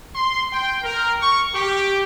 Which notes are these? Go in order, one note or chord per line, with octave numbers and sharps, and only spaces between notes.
C6
G5
A#4
C#6
G4